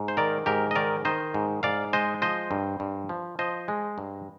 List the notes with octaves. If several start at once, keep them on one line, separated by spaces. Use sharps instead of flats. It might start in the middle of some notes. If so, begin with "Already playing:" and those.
Already playing: G#2
C5
D#3 A#4 D5
G#2 G4 A#4
D#5
D#3 A#4 D5
D#3 C5 D#5
G#2
G#2 D5 F5
G#3 C5 D#5
F3 C5 D#5
G2
G2
F3
F3 C5 D#5
G#3
G2